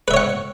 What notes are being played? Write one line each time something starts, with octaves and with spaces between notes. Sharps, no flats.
B4 C#5 E5 F#5